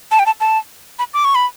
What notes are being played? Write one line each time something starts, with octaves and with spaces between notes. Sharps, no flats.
A5
G5
A5
A5
B5
D6
C#6
B5